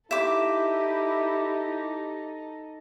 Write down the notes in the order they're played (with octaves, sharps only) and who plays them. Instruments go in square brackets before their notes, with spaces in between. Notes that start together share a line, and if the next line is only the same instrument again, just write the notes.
[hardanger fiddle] D#4 A4 [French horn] E4 [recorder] G4 [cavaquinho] E5 D6